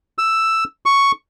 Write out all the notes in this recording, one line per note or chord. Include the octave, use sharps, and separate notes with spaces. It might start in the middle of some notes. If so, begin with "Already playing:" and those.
E6
C#6